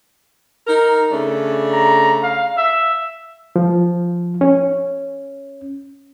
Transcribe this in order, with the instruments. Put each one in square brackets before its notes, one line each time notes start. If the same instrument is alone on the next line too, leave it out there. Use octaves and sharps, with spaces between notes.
[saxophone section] D#4 A#4
C#3 A3 D4
[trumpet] A#5
F5
E5
[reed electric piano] F3
C#4